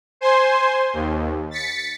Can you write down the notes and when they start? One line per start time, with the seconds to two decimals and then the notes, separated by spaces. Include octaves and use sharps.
0.21 C5 G#5 C6
0.93 D#2
1.51 A6 B6 C#7